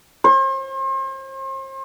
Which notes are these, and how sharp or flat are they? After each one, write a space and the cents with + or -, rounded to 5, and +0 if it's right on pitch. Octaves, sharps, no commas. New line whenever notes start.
C5 +40